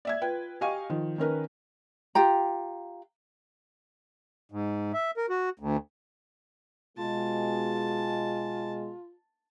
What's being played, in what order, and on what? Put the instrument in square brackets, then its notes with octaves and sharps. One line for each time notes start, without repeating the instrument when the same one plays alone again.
[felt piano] D5 E5 G#6
F4 B4 G5
G4 D#5 F5 G#5 C#6
D#3 F3
D#3 C#4 A#4 B4
[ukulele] F4 G4 G5 A#5
[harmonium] G#2
E5
A#4
F#4
D2
[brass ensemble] B2 G#3 [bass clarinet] F4 [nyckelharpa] A5